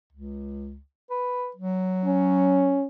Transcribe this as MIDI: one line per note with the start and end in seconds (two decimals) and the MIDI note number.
0.13 0.79 37
1.10 1.50 71
1.56 2.79 54
2.05 2.85 61